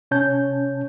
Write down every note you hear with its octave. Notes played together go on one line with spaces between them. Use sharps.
C3 C#4 C#5 A5 G6